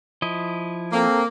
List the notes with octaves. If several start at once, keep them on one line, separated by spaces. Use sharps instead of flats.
F3 E4 D#5
A#3 C4 A4 A#4